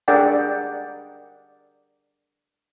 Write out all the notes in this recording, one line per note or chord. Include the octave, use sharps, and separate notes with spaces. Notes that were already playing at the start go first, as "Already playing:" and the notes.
D4 G#4 A#4 D5 F#5 G5